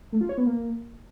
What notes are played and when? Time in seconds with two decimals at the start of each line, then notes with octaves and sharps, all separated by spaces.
0.12 A3
0.21 F4
0.29 C#5
0.38 B3
0.46 A#3